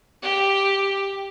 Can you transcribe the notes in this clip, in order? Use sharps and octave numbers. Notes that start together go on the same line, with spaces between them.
G4